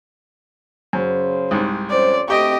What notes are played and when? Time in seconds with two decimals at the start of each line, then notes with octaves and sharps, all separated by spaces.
0.93 F#2 C#3 C5
1.51 C2 G#2
1.90 F2 C#4 C5 D5
2.28 D2 A3 C4 G4 D#5 G5 C#6